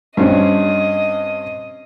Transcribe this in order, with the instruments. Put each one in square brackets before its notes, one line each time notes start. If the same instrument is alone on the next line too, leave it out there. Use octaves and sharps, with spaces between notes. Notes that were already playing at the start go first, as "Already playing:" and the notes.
[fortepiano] G2 C4 C#4 [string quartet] D#5